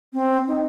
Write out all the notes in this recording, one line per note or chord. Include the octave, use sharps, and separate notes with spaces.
C4
D#4